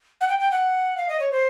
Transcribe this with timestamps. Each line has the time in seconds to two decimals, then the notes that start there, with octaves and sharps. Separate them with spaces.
0.21 F#5
0.29 G5
0.39 G5
0.52 F#5
0.97 F5
1.09 D#5
1.20 C#5
1.32 C5